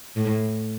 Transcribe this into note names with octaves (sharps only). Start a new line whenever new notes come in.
A2